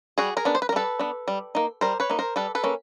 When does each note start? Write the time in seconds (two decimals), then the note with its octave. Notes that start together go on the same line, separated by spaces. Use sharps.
0.18 G3 F#4 G#4
0.37 G#4 A#4
0.45 B3 D4
0.55 C5
0.62 B4
0.69 A#4
0.72 G3 A4 B4
0.99 B3 D4
1.28 G3
1.55 A#3 D#4
1.81 G3 A#4 C5
2.00 B4 C#5
2.10 A#3 D#4
2.19 A#4 C5
2.36 G3 A4 B4
2.55 A4 B4
2.63 A#3 C#4